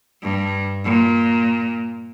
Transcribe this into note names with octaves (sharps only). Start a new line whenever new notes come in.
G2
A#2